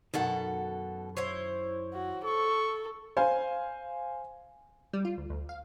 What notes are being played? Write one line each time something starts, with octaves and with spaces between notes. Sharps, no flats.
F#2 B2 D#3 A4 F#5
E4 C5 C#5
F#4
A4 C#6
C5 F5 G#5
G3
F4
D2
D2
F5